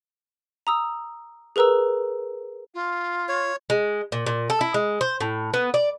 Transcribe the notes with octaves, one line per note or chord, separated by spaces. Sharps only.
A#5 D#6 E6
G#4 A#4 B4 A#5 E6
F4
C#5
G#3
A#2
A#2
A4
E4
G#3
C5
A2
B3
D5